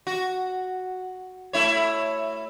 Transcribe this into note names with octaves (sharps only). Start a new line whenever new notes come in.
F#4
A3 E4 C#5